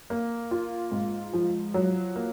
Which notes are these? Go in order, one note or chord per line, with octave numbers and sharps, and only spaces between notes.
A#3
F4
G#2
F3
F#3
A#3